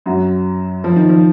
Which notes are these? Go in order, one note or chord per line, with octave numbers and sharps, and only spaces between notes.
F#2 F#3
F3
D#3
F3